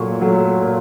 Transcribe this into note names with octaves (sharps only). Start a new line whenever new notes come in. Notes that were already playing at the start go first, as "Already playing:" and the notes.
Already playing: A#2 F#3 A3 C#6
F#3 A3
A#2